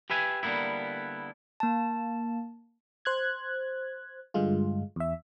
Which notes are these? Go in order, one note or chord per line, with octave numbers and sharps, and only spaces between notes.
G4 B4 E5 G#5
D3 G3 A#3 B3 E4
A#3 A5
C5 F#6 G#6
G2 D3 G#3 F4
E2 E5